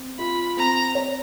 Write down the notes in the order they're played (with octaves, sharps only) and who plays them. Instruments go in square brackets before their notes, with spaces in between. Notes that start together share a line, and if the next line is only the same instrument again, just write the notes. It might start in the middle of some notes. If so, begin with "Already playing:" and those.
Already playing: [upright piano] C4
[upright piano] F4 [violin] B5
[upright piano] C4 [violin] A#5
[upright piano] C#5